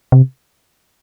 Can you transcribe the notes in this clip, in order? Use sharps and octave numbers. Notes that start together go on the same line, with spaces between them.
C3